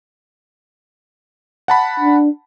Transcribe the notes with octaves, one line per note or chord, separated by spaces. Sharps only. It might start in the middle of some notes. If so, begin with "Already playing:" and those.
F#5 A5 B5
D4